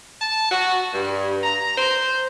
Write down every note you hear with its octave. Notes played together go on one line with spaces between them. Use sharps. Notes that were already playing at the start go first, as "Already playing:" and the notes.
A5
F#4
G2
A#5
C5